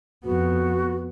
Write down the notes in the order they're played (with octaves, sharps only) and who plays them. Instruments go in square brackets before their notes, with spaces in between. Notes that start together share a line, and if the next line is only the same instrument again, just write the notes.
[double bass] F2 B3 [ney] F#4